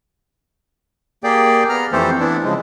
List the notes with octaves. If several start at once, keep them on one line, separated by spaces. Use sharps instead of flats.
A#3 G4 G#4 D5 G5
B3 A#5 F6
F2 E3 A3 G4 A4 C5
E3 B3 D4 E4
C#3 F3 G#3